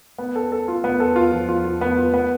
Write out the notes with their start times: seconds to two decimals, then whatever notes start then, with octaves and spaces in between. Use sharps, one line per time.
0.18 B3
0.35 A4
0.52 A4
0.68 F4
0.84 B3
1.00 A4
1.16 F4
1.32 F3
1.49 F4
1.65 F4
1.81 B3
1.98 F4
2.14 B3